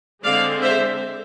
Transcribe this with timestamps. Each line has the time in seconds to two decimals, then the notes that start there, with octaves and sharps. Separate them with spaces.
0.23 D3 G#3 C4 D5 F5
0.61 C5 E5